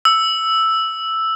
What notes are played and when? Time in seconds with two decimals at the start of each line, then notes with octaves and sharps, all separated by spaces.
0.05 E6